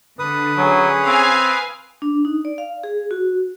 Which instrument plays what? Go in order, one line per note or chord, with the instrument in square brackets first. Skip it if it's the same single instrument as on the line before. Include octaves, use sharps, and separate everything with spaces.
[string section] D3 [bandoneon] B4 D#6
[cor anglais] F#3 [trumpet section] C#4 G#4 C#5
[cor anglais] C4 [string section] F5 G#5
[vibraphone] D4
D#4
D5
F5
G#4
F#4